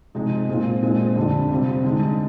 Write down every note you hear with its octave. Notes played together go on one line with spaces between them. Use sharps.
C3 F3 G#3 D#4
A#2 G#3 C4 F4
A#2 G#3 C4 F4
F2 D3 G3 D4
C3 G3 C4 F4
D3 G#3 D#4